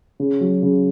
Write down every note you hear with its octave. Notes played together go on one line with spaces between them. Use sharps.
C#3
F#3
C#3